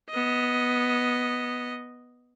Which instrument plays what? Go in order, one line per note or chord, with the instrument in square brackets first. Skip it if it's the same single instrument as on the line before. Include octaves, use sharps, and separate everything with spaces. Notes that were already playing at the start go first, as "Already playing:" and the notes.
[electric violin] B3 D#5